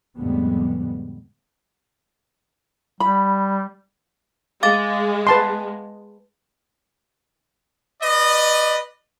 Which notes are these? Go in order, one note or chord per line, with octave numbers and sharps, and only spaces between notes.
F2 A2 D3 G3 G#3 B3
G3 B5
G#3 F5 D6 A6
B4 A5 C6
B4 D5 D#5